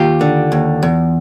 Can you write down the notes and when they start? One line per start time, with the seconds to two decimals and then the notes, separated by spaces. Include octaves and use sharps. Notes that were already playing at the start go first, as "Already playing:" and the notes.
Already playing: D#2 F4 G4
0.21 D3
0.52 D#2
0.83 E2